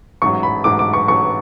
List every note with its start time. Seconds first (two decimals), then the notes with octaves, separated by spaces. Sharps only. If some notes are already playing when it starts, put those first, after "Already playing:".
0.22 A1 G#2 F#3 C#6
0.43 B5
0.64 A1 G#2 F#3 D6
0.79 D6
0.93 C#6
1.08 A1 G#2 F#3 C#6